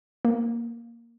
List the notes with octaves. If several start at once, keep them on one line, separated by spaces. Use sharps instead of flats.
A#3